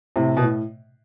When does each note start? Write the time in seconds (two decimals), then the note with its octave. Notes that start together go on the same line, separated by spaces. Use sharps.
0.16 A2 C3
0.37 B2
0.42 A2